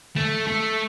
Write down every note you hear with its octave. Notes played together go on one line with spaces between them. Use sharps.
A3
A3